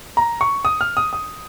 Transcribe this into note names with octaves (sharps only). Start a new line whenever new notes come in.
A#5
C#6
D#6
F6
D#6
D#6